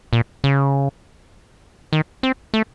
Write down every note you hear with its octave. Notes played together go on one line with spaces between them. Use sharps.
A#2
C#3
D#3
C4
A3